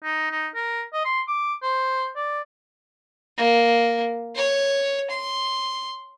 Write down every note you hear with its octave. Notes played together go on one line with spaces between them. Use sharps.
D#4
D#4
A#4
D#5
C6
D6
C5
D5
A#3
C#5
C6